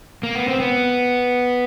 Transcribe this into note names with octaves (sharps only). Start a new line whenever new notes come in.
A#3
B3
C4
B3